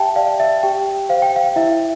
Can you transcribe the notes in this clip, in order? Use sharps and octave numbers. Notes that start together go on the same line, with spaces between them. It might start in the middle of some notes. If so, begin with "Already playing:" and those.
Already playing: G4 E5 G5 A5
D5 F5
E5
G4 G5
C5 F5
G5
F5
E4 E5